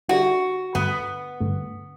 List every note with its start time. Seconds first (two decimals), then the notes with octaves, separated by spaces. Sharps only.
0.09 D3 G3 D4 F#4 G4
0.75 G2 D3 A3 B3
1.40 G2 D3 A3